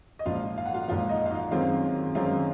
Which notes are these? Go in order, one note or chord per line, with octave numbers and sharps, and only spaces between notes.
D#5
A#1 G#2 F3 F4 F5
F5
F#5
F4 F5
A#1 G#2 F3 F4 F5
D#4 D#5
F5
D#4 D#5
F#2 D#3 G#3 C4 F4 F5
F#2 D#3 G#3 C4 F4 F5